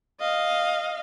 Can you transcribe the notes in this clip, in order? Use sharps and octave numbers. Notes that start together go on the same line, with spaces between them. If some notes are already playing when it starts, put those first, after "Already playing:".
D#5 F5